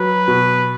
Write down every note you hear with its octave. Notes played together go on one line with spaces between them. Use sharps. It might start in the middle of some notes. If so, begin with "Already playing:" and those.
Already playing: F#3 B4
B2